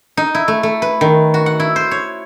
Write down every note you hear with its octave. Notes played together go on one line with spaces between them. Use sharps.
D#4
E4
A3
A3
B4
D#3
F#4
F#5
E4
C5
C#5